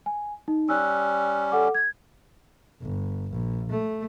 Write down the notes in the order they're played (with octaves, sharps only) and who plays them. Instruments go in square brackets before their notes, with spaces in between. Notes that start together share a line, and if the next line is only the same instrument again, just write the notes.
[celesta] G#5
D#4
[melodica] G3 C#4 [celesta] E6 F#6
[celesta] A4 F#5 D6
G#6
[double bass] G1
A#1
A3